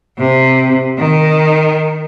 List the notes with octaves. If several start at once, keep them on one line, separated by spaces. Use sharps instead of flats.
C3
D#3